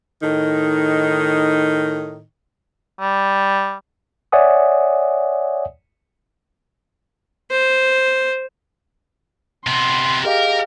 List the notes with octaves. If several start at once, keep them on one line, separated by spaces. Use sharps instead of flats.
A2 D#3 D#4
G3
C#5 D5 E5 F#5 G#5 D#6
C5
C3 B3 C6
G4 G#4 A#4 D#5 F5